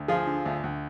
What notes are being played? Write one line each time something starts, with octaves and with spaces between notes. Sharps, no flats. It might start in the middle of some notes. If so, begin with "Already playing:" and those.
Already playing: D2
F3 F4 G#4
D3
D2
D2